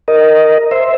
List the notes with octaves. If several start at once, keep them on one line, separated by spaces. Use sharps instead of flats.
A#4 D#5
C5 E5